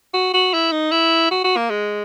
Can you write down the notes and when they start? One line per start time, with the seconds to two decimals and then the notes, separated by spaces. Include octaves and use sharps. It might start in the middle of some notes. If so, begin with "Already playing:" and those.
0.14 F#4
0.34 F#4
0.54 E4
0.72 D#4
0.91 E4
1.31 F#4
1.44 F#4
1.56 A#3
1.70 G#3